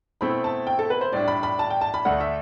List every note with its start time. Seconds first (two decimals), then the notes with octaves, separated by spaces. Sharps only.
0.21 B2 A3 C4 E4 B5
0.44 A5
0.67 G5
0.79 A4
0.90 B4
1.01 C5
1.13 A2 G3 D4 D5
1.28 B5
1.43 B5
1.59 A5
1.70 G5
1.81 A5
1.94 B5
2.05 D2 D3 A3 D4 F#5
2.20 E5